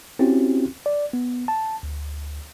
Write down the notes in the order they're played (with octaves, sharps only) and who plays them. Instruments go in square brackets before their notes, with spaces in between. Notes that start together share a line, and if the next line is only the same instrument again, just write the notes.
[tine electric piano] C4 C#4 E4 F#4 G4
D5
B3
A5
D2